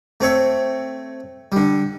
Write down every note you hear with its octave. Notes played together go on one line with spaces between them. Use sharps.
A3 C4 C#5 E5
D3 G3